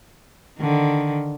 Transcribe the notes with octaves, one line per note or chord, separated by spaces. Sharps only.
D3 D#3